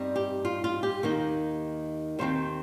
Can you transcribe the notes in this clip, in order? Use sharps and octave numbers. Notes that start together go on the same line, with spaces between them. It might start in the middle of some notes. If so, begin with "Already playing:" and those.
Already playing: G2 G3 C4 D#4
G4
F4
F4
G4
D#2 D#3 A#3 D#4
D#2 D#3 C4 C5